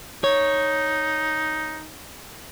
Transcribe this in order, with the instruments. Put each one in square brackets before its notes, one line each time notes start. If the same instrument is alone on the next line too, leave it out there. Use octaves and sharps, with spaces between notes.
[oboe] D#4 [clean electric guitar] C#5